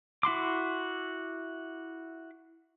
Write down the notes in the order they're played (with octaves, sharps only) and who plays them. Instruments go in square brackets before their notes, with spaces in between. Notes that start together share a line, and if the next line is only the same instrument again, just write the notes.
[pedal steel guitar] E4 F#4 C6 D6